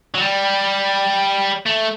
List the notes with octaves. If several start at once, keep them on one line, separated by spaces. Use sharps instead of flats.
F#3
G3
A3